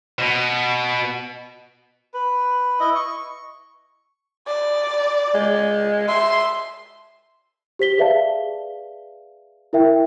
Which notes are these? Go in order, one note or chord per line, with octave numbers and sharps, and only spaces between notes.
B2
B4
E4 D#5
C#6
D5
G#3
E5 C6
G4 C5 B6 G7
G#4 B4 D5 E5 F5 A5
E4 A#4 E5 G5